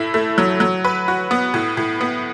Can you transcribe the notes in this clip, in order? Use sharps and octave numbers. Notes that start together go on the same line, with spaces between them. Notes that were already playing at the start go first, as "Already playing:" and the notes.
Already playing: A2 A3 E4
A3
F#3
F#3
B4
F#4
B3
A2
A2
B3